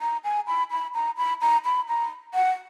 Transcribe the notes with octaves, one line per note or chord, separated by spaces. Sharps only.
A#5
G#5
B5
B5
A#5
B5
A#5
B5
A#5
F#5